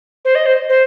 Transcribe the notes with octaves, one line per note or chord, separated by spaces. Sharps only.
C5
D#5
C5
C5